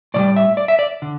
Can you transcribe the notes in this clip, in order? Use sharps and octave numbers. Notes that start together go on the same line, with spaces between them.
A2 E3 G3 D5
E5
D5
E5
D5
D3